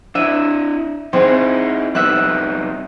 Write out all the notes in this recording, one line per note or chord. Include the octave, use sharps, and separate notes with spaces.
D4 E4 E5 D#7
C4 D#4 E4 G#4
G3 B3 D#4 E5 F#6